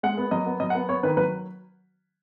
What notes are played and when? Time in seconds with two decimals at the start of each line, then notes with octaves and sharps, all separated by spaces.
0.03 G#3 F#5
0.18 B3
0.31 F#3 D#5
0.46 B3
0.60 F#3 D#5
0.70 F#5
0.75 B3
0.89 B3 C#5
1.03 D#3 B4
1.17 F#3 B4